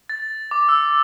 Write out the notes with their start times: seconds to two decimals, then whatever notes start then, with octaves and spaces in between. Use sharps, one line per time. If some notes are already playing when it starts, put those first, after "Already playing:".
0.09 A6
0.51 D6
0.69 E6